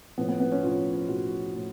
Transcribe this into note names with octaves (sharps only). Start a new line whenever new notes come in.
A2 F3 B3
B3
B3
C#4
A2 F3 F4
A2 F3 F#4
A2